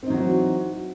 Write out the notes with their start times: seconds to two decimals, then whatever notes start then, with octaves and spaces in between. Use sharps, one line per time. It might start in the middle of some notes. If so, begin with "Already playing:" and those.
0.03 C4
0.06 D#4
0.10 F#3
0.14 F#4
0.18 E3